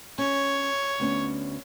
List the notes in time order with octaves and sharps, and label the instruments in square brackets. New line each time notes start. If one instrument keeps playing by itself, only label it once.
[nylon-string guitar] C#4 [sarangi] C#5
[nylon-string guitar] D2 B3 C#4